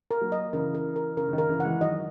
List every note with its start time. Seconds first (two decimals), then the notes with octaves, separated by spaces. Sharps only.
0.11 A#4
0.21 F#3 A#3
0.32 D#5
0.53 C#3 E3 A#4
0.75 A#4
0.96 A#4
1.17 C#3 A#4
1.29 C#3
1.33 D#3
1.38 A#4
1.49 C#3 E3
1.60 E3 G#3 F#5
1.81 D#3 F#3 D#5